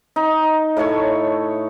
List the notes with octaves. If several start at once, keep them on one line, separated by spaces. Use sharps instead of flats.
D#4
A2 A3 C#5 A5